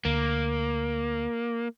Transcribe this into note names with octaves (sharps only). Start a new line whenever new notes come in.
D2 A#3